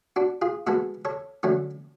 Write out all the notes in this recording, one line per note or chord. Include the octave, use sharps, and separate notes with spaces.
D4 F#4
F4 G#4
B2 G#3 B3 F#4 A4
A4 C#5
D3 F#3 A3 C#4